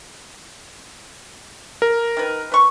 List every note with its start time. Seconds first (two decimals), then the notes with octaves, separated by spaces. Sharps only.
1.82 A#4
2.17 D#3 B4
2.52 B4 C#6